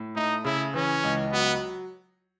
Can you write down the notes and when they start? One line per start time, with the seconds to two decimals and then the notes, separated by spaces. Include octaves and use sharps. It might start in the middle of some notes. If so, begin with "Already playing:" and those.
Already playing: A2
0.15 A3 D#4
0.45 C#3 E4
0.74 E3 C#4
1.03 C#2
1.32 F#3 B3